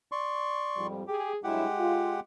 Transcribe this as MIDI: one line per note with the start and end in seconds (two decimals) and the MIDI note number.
0.12 0.87 74
0.12 0.87 84
0.12 0.87 85
0.76 1.02 41
0.76 1.02 44
0.76 1.02 55
1.07 1.33 67
1.07 1.37 68
1.44 1.65 43
1.44 1.65 54
1.44 2.20 56
1.44 1.65 64
1.44 2.20 67
1.44 2.20 78
1.79 2.15 65